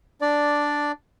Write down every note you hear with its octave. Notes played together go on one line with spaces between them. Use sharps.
D4 D5